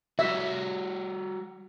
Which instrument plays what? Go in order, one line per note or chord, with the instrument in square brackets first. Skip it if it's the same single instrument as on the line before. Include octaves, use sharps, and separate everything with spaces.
[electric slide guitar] G3 F#4 [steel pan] E5